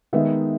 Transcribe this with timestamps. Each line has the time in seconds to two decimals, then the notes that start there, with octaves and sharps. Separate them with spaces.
0.13 D#3 G#3 B3 D#4 E5